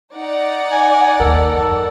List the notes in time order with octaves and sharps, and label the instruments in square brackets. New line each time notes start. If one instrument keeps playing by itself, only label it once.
[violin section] D#4 D5 F#5
[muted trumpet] G#5
[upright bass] D#2 [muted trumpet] A4 [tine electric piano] A#4
[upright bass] F#2 [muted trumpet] A4